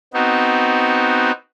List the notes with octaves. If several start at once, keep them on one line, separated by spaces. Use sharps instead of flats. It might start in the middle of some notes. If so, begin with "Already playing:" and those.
B3 C4 D#4 F#4